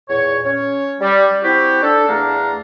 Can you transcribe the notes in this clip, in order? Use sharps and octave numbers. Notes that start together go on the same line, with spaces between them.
E2 A#2 C#5
C#4 C#5
G3
C4 E4 F#4 G4
D4 A4
E2 A3 D4 F5 A#5